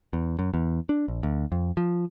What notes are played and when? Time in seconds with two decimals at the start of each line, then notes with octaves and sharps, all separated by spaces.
0.13 E2
0.39 F#2
0.54 E2
0.89 D4
1.08 A#1
1.23 D2
1.52 F2
1.77 F3